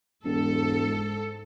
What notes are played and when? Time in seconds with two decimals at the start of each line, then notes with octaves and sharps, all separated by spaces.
0.24 E1 G#2 A4